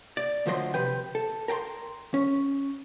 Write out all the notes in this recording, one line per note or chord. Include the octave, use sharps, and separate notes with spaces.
D5
D2 F3 F#3 C5 D#5 C6
C3 B4 G5
A4
A#4 G5 A5 C6
C#4